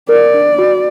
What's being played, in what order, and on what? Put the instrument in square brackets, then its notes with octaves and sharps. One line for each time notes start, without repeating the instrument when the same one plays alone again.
[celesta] A#4 [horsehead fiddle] D5
[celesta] D4
F#4